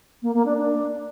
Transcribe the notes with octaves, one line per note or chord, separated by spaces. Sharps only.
A#3
A#3
D4
D4